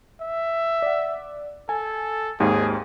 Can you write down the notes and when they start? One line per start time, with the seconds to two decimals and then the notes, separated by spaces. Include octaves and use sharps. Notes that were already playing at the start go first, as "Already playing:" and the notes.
0.21 E5
0.82 D5 F#5
1.69 A4 G#5
2.39 G#1 D#2 G#2 G#4